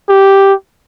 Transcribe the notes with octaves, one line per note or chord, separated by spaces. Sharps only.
G4